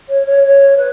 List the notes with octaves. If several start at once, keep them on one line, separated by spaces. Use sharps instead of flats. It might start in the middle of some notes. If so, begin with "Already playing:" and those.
C#5
C#5
C#5
B4